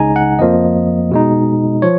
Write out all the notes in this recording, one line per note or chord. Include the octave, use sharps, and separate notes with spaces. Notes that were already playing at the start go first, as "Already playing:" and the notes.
Already playing: C#2 C#3 G#3 D#4 G#5 A#5
F#5
F2 F3 A#3 D#5
B2 G#3 D#4
F3 C#5